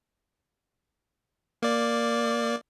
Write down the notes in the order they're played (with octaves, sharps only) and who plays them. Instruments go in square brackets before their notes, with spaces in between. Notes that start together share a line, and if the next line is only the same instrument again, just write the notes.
[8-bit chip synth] A#3 D5